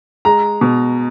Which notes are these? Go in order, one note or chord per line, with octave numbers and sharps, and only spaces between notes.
G#3 A#5
B2